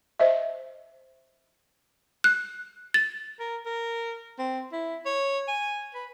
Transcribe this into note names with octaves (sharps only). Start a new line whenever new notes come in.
C5 D#5 E5
F#6
A6
A#4
A#4
C4
E4
C#5
G#5
B4